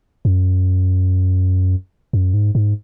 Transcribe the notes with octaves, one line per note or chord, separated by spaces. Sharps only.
F#2
F#2
G#2
G#2